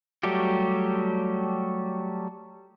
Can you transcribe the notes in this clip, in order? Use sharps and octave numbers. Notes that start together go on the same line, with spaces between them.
F#3 G3 A3 F#4 G4